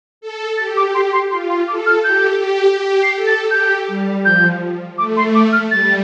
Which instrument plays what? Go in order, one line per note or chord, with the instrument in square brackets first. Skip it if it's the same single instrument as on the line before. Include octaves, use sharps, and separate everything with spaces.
[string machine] A4
[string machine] G4 [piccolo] A6
[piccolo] D6
C6
C6
[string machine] F4 [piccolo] C6
[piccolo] C6
[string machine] A4 [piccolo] D6
[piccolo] F6
[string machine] G4 [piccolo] G6
[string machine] G4
G4
[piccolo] C7
[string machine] A4
[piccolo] A6
[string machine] G4 [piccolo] G6
[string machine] G3
[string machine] F3 [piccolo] G6
[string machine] A3 [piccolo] D6
[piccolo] C6
D6
F6
[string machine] G3 [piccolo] A6